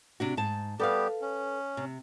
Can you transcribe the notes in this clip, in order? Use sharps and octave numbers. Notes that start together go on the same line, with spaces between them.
C3 D4 F#4
G#2 A5
G3 B3 G4 A4 B4 F5
C#4
C3